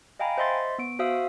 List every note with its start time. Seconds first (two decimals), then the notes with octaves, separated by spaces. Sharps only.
0.19 D#5 F5 G5 G#5 A#5 B5
0.38 C5 D#5 E5 C6 A6
0.79 B3 D7
0.99 F#4 C5 E5 F5 D#6 E6